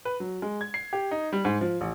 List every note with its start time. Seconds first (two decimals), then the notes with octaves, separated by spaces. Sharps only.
0.05 B4
0.20 F#3
0.42 G#3
0.61 G#6
0.74 C7
0.93 G4
1.11 D#4
1.33 G3
1.45 G#2
1.61 F3
1.81 A1